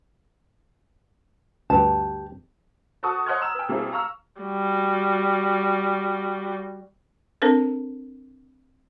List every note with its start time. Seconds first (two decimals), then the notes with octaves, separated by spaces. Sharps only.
1.70 D2 G2 G4 B4 A5
3.03 F#4 A4 F#5 A5 C#6 D#6
3.26 C#5 D#5 F#5 C6 F6 G#6
3.42 A#5 E6 F6 E7
3.55 B4 G5
3.68 B2 G3 A#3 C4 E4 G#4
3.92 F5 A#5 C#6 E6 F6
4.41 G3 F#4
7.42 C4 D4 A4 A#4 C5